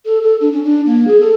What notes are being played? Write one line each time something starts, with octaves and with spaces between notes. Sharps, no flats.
A4
A4
D4
C#4
D4
A#3
G#4
A4